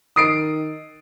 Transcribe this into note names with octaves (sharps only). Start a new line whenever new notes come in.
D#3 D#6 C7 D7